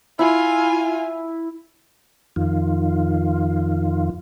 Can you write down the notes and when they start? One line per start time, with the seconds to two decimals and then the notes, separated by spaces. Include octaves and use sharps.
0.19 E4 F4 G#5
2.36 F2 D#3 F4